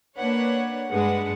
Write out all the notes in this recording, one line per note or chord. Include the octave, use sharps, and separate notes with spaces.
A#3 D4 B4 C#5 F#5
G2 G#3 D4 G#4 B4 F#5